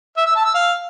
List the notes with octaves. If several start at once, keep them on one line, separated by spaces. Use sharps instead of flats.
E5
E6
A5
E6
F5